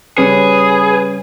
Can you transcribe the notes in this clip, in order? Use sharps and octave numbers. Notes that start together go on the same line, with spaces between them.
C#3 G3 C#4 G#4 B4